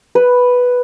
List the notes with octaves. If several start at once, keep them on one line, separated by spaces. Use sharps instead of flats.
B4